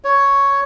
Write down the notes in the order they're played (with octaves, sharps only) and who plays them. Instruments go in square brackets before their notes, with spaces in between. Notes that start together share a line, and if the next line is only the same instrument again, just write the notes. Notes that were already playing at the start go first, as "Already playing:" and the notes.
[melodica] C#5